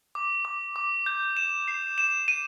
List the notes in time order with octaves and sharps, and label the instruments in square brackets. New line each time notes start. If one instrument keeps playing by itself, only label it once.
[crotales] D6
D6
D6
G6
E7
C7
E7
D#7